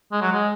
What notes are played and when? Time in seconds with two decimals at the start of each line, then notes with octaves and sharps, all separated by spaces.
0.12 G#3
0.21 F#3
0.32 G#3